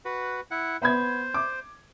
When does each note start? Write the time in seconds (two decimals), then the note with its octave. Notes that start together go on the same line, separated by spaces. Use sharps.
0.05 F#4 B4
0.51 E4 F#5
0.82 B3 C5 B5 G#6
1.34 D6